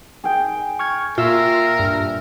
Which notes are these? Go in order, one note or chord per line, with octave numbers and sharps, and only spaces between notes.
G#4 G5
C#6 F6 G#6
A#2 F4 A#4 E5 E6
G2